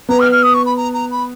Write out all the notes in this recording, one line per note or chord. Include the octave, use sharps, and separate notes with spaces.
B3 A#5
F6
F6
D#6
C#6
B5
A#5
A#5
B5